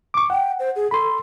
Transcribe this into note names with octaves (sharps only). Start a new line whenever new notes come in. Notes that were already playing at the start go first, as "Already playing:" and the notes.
C#6 D6
F#5 G5
C5
G#4
A4 B5 C6